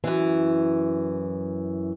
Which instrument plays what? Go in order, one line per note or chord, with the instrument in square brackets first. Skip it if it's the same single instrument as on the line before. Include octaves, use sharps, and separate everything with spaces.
[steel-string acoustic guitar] F#2 E3